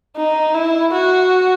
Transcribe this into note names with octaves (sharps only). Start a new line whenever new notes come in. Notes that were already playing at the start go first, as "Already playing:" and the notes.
D#4
E4
F#4